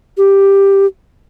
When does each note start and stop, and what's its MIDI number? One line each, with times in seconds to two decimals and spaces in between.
0.17 0.86 67